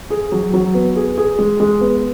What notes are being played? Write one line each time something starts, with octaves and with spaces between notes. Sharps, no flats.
G#4
F#3
F#3
B3
G#4
G#4
G#3
G#3
B3